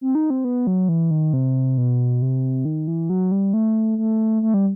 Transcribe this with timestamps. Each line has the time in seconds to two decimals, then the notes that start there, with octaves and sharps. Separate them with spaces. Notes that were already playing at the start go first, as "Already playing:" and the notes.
0.01 C4
0.15 D#4
0.30 C4
0.45 B3
0.67 F#3
0.89 E3
1.11 D#3
1.33 C3
1.78 B2
2.22 C3
2.65 D#3
2.87 E3
3.10 F#3
3.32 G3
3.54 A3
3.98 A3
4.42 A3
4.54 G3